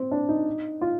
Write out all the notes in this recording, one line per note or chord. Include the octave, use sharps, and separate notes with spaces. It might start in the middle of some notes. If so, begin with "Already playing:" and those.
Already playing: C4
D4
D#4
F4